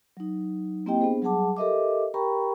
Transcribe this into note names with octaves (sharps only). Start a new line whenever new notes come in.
F#3 D#4
A#3 C4 E4 G4 D#5 G5
B3 D4 G#4 C5
F#3 G3 G#4 F#5 A5 D6
G4 A4 A#4 D#5 E5 D6
G4 A#4 G5 A#5 B5 C#6